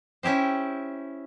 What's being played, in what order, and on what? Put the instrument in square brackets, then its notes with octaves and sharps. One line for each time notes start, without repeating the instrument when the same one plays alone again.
[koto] C#4 E4 G4 C5